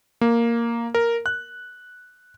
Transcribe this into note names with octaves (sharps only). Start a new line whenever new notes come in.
A#3
A#4
F#6